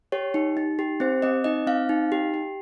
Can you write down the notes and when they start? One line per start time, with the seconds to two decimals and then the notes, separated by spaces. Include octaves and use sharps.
0.12 G4 C#5
0.34 D#4
0.57 D#4
0.79 G4
1.00 C4 C5
1.22 C4 D#5
1.44 D#4 D#5
1.67 C4 F5
1.89 D#4
2.12 G4
2.34 G4